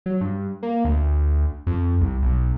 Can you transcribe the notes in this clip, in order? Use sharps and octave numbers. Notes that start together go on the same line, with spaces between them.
F#3
G2
A#3
D2
F2
C2
B1